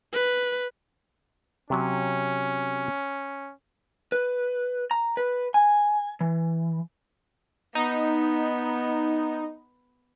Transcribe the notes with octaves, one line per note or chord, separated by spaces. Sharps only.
B4
C3 F#3 C#4
B4
A#5
B4
G#5
E3
B3 D#4